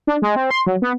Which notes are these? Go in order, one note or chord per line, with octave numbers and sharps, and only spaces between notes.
D4
G#3
C4
C6
F#3
B3